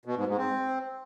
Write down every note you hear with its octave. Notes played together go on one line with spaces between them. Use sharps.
B2
G#2
G#2
C4